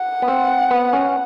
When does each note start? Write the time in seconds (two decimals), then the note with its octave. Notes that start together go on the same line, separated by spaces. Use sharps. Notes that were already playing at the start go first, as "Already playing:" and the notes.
Already playing: F#5
0.22 B3
0.28 C4
0.71 B3
0.93 C#4